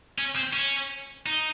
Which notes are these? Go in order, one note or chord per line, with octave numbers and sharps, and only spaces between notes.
C#4
C4
C#4
D#4